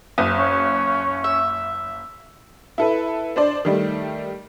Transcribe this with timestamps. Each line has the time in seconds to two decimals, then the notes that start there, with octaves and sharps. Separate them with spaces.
0.18 F#1 D#6
0.36 C#4
1.24 E5
2.78 E4 A4 B4
3.36 D4 C5 D5
3.65 D#3 G3 A3